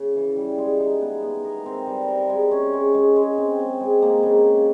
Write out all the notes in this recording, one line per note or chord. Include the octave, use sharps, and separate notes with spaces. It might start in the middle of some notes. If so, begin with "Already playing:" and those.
Already playing: C#3
E3
G3
G#3
D#4
B3
B3
A#4
C4
G3
A#4
G#3
C#4
G#3
G#3
G#3
C4
C4
G#3
A#3
C#3
C#3